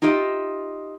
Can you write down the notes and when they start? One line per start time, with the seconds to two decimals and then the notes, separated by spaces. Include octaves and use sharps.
0.02 D#4 F4 G4 D#5 E5